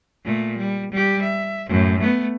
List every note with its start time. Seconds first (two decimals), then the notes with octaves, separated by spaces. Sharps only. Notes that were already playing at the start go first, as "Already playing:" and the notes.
0.24 A#2 A3
0.58 G3
0.92 G3 G4
1.22 E5
1.67 F#2 A2
2.00 A3 B3